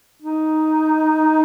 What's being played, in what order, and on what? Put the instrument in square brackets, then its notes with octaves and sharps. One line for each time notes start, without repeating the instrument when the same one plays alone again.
[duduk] D#4